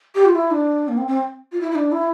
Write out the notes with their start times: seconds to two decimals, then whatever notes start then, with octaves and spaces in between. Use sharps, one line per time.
0.15 G4
0.25 F4
0.35 E4
0.51 D4
0.88 A#3
0.98 C4
1.08 C4
1.52 F4
1.61 E4
1.71 E4
1.75 D4
1.92 E4